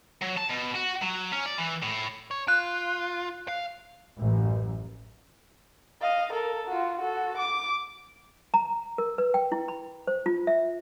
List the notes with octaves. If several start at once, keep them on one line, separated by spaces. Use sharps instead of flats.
F#3
A5
B2
F#4
F#3
C#4
D5
E3
A2
C#5
F4 F#6
F5
A1 F#2
D#5 F5
A4 A#4
F4 F#4
F#4 A4
D6
A#5
A#4
B4
G5
E4
B5
C5
F4
E5